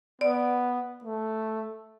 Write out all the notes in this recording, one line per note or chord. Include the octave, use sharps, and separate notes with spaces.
B3 D5
A3